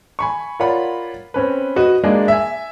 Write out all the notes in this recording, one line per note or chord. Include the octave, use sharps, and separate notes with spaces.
G#5 B5 C#6
F4 A#4 C#5 D5 F#5 B5
C4 C#4 B4
F#4 B4 D#5
G#3 A#3 D4 D5 D#5
E5 G#5